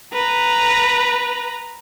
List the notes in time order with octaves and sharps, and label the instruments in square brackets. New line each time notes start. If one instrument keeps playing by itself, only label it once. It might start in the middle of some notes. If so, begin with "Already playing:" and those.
[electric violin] B4 A#5